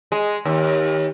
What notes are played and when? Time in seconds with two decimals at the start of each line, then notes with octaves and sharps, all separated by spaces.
0.12 G#3
0.45 D#2